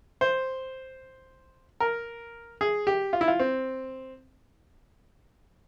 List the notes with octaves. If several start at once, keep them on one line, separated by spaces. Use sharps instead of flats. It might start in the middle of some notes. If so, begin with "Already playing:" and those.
C5
A#4
G#4
G4
F4
E4
F4
C4